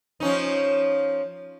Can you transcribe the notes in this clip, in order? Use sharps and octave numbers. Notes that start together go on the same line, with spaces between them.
F3 C#4 D#4